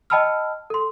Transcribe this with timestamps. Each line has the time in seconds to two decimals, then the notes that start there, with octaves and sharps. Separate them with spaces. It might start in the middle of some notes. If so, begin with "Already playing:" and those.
0.10 D#5 G5 A5 B5 E6 F6
0.70 A4 C6